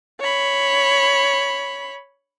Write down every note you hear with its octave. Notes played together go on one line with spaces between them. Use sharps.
C#5 B5